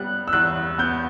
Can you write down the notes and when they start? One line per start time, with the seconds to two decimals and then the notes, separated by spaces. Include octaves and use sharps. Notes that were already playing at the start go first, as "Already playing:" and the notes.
Already playing: G3 B3 F#6
0.28 E6
0.33 E2 F#6
0.78 B3 G6